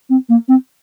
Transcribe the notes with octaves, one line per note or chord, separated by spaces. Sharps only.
C4
A#3
C4